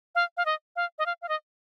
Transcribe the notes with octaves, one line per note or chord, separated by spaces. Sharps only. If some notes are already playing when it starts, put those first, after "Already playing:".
F5
F5
D#5
F5
D#5
F5
F5
D#5